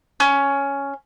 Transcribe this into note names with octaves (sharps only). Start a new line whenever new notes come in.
C#4